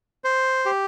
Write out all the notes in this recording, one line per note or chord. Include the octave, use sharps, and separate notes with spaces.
C5
G4